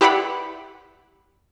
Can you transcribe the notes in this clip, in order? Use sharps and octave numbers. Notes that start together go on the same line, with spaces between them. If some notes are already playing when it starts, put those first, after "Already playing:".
E4 G4 B4 D5 F#5 B5